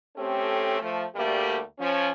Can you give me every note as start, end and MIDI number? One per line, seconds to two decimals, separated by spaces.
0.17 0.78 57
0.17 0.78 60
0.17 0.78 61
0.17 0.78 67
0.17 0.78 69
0.81 1.03 53
0.81 1.03 57
1.15 1.59 38
1.15 1.59 55
1.15 1.59 57
1.15 1.59 58
1.15 1.59 67
1.79 2.11 53
1.79 2.11 61